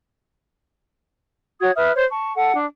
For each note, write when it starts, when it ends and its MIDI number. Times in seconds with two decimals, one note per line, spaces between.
1.61 1.72 66
1.61 1.72 73
1.61 1.72 87
1.61 1.72 92
1.76 1.93 71
1.76 1.93 76
1.76 1.93 87
1.76 1.93 89
1.95 2.04 72
1.95 2.04 73
2.10 2.34 81
2.10 2.34 85
2.35 2.55 69
2.35 2.55 78
2.55 2.66 62